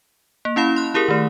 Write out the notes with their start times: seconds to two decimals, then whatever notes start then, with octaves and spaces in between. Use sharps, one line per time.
0.45 A#3
0.56 C#4 E4 F5 B5
0.76 C6 F#6
0.94 E4 G4 G#4 A#4
1.08 D#3 A3